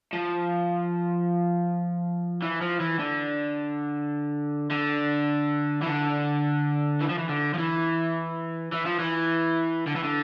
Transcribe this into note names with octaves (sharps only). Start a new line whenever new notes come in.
F3
E3
F3
E3
D3
D3
E3
D3
E3
F3
E3
D3
F3
E3
E3
F3
E3
D3
E3
D3